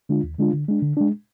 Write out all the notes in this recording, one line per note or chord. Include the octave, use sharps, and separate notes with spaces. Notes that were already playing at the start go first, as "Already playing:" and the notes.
D3 G#3 D4 F4
D#2
D3 G#3 D4 F4
D3
G#3 D4
D3
G#3 D4